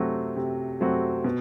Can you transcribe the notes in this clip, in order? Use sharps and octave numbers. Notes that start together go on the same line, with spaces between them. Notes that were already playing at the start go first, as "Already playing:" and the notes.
Already playing: C3 F#3 A3 C4 F#4
C3
F#3 A3 C4 F#4
B2